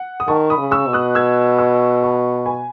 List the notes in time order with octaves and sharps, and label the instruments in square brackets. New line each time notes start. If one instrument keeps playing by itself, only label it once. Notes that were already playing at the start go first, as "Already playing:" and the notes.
Already playing: [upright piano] F#5
D#6
[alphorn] D#3 [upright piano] A5 C#6
[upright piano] B5 D#6
[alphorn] C#3
[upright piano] C#6 E6
[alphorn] B2
[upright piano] D#6 F#6
E6 G#6
C#6 E6
A5 C#6
G#5 B5